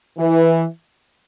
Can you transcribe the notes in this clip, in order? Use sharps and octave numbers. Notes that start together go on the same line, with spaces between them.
E3